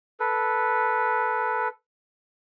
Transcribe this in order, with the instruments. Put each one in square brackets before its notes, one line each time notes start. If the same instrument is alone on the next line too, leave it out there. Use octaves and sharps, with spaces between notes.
[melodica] A4 B4